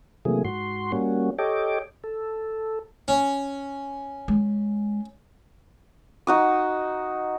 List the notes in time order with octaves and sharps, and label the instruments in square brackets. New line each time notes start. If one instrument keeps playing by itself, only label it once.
[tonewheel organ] C3 E3 F#3 A3 A#3 G#4
G#2 F#4 C6
G3 A#3 C#4 F#4
G4 A4 C#5 D#5 G5 D6
A4
[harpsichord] C#4
[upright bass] G#3
[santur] D#4 F#4 D#6